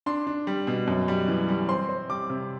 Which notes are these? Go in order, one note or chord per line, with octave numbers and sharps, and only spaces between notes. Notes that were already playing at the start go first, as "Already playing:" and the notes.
D4 C6
D4
G3
B2
F#2
G3
E3
G3
C4 C6
C4
G3 D6
C3